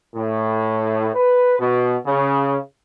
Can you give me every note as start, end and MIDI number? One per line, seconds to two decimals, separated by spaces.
0.16 1.10 45
1.14 1.59 71
1.59 1.96 47
2.06 2.57 49